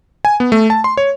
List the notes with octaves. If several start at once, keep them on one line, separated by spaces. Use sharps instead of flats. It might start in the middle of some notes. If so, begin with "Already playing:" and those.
G#5
B3
A3
A5
C6
C#5